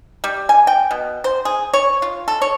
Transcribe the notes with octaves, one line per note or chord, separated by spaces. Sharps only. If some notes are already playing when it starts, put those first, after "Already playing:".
G3
G#5
G5
B2
C5
G#4
C#5
F4
A4
C#5